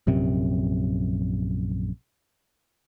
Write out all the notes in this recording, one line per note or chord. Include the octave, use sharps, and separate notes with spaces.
A#1 F#2 C3